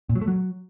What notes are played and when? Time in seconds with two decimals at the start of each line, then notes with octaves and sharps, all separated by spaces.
0.09 A#2
0.15 F#3
0.22 A3
0.28 F#3